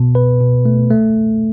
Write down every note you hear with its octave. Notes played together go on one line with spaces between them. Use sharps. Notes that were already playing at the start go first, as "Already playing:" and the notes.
Already playing: B2 B3
B4
B2
A3
A3